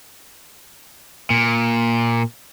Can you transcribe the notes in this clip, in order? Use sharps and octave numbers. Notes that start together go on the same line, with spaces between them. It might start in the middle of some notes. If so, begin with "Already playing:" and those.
A#2